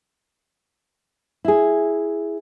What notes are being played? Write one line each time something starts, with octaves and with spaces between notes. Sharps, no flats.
E4 G#4